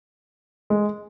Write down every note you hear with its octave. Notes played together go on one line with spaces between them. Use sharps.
G#3